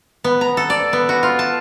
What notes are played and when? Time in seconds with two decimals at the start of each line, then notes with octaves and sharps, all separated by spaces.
0.24 B3
0.41 A#5
0.57 A4
0.70 D5
0.93 B3
1.09 F#4
1.23 F4
1.39 A5